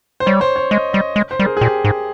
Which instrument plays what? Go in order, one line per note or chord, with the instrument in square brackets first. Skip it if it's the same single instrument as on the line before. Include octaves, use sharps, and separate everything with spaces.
[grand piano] C5
[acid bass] G3 [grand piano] C#5
[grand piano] C5
C#5
[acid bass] G#3 [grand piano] D#5
[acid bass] G3 [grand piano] D#5
[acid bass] G#3
[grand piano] C5
[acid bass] G3 [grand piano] A#4
[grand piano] G#4
G#4
[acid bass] A#2 [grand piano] G4
[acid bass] G#2